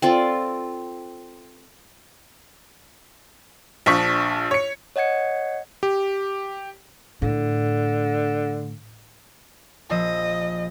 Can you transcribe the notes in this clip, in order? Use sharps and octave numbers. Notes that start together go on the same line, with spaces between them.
C4 F4 A4 D5
A#1 F3 D4 C#6 B6
C#5 C#7
C#5 D#5 F#5 G#6 C#7
G4
A2 D3
A#1 F3 D#5 E6